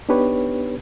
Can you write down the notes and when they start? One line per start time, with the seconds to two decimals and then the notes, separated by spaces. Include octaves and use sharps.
0.09 B3 D4 D#4 G4 B4 C#5